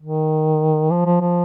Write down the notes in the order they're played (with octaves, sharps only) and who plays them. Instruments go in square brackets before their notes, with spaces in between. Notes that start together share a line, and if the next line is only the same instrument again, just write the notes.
[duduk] D#3
F3
F3
F3